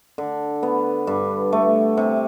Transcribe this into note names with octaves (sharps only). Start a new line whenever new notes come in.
D3
B3
G2
A3
C3